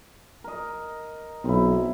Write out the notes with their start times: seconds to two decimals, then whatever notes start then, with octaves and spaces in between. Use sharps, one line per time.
0.44 A#4 D#5
1.45 B1 C4 E4